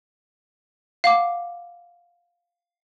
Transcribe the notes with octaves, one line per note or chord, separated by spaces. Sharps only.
F5 F#5 D6